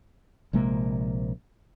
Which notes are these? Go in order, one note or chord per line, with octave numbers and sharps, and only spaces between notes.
A#1 C3 G#3 A#3